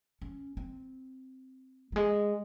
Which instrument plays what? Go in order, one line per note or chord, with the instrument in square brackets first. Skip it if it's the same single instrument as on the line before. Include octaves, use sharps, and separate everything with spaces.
[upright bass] C#4
C4
F#3
G#3